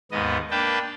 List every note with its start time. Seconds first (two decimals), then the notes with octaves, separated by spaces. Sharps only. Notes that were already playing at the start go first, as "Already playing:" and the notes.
0.12 D#2 G#2 B3 D#5
0.51 A#3 D4 B4 G5 A5